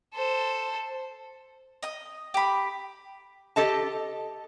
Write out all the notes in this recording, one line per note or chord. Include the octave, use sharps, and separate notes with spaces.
A4 C5
D#5 D#6
G4 B5
G4 A4 D#5 A5